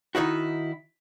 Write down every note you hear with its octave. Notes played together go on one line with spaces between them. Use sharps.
D#3 D#4 E4 F#4